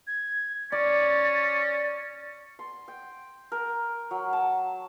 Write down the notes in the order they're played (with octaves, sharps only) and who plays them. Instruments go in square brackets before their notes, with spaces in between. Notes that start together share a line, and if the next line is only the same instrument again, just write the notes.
[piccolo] G#6
[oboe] C#4 [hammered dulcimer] D5 [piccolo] A6
[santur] C6
G5
A#4
F#3
A5